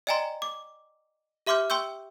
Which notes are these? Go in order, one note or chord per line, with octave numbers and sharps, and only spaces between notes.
D5 D#5 G5 G#5 A#5 C6
D6
G4 E5 C6 D6 F6 G6
G5 C6 C#6 E6 G6